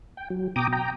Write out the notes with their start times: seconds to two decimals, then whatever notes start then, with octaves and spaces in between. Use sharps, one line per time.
0.17 G5
0.30 F#3
0.56 B2 G5 A#5 D6 D#6
0.73 G5 A#5